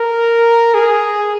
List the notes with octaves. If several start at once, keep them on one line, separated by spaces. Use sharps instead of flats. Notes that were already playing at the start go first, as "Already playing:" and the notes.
Already playing: A#4
G#4